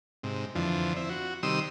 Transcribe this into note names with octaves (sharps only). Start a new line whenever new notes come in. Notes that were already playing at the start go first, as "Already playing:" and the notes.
G#2 C3
F2 D3 E3 F3
C4 E4
F#4
C3 D#3 G3 C6 D#6 E6